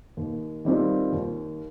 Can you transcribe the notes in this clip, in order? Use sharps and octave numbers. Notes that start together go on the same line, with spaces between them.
D#2
D#3 G3 C4 F4
D#2